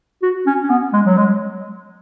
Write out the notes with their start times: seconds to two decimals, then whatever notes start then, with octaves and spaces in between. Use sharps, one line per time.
0.23 F#4
0.47 C#4
0.63 C#4
0.70 B3
0.93 G#3
1.05 F#3
1.17 G#3